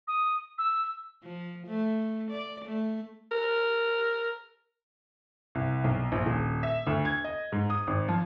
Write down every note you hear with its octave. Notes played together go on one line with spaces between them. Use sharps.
D#6
E6
F3
A3
D5
A3
A#4
C2
B1
A#1
D#1
E5
D2
G#6
D#5
G#2
D#6
G#1
F3